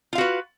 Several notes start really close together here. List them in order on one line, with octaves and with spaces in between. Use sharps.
F4 F5 F#4 B4